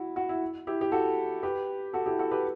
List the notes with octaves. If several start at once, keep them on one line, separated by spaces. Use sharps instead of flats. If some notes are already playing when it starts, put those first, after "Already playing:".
Already playing: E4 F#4
F#4
E4
E4 G4
G4
F#4 A4
G4 B4
F#4 A4
E4 G4
F#4 A4
G4 B4